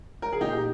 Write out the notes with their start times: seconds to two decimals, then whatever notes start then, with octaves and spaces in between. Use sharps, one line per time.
0.22 A#4
0.32 G#4
0.41 A#2 D#4 G4